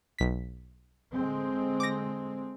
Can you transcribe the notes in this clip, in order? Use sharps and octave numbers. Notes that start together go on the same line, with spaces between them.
B1 B6
D3 G#3 C4
D6 A#6